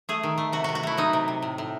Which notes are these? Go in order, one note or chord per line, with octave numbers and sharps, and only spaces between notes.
A3 G#4
D#3
A3
C3 F#4
C3 F#4
F#4
A3 E4
F#3 D#4
C3
C3
A2
A2